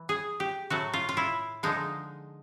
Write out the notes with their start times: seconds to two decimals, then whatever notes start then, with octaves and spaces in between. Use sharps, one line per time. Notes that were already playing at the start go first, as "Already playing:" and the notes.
Already playing: E3
0.09 G#4
0.40 G4
0.70 A2 F#3 A3 F#4
0.93 F4
1.09 F4
1.17 E4
1.63 D3 F3 G#3 D#4